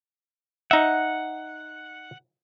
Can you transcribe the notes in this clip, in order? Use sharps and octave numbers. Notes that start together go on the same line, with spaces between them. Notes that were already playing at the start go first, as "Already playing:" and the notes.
D#4 E5 F#5